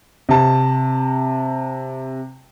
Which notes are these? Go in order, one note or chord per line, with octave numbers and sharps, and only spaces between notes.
C3 A5